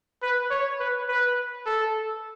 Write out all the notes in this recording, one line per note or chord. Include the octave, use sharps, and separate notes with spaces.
B4
C#5
B4
B4
A4